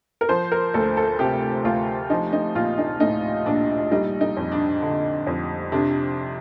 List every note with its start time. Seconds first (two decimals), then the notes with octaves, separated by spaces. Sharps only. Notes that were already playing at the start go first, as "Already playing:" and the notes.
0.21 A#4
0.29 F3 C5
0.51 A#4
0.74 D2 A4
0.97 A4
1.19 C3 G4
1.64 D2 F4
2.10 F3 D#4
2.32 D#4
2.55 A#1 F4
2.78 D#4
3.00 A2 D#4
3.46 A#1 D4
3.91 G3 D#4
4.21 D#4
4.37 F2
4.52 D4
4.82 D3
5.27 F2
5.72 C3 D4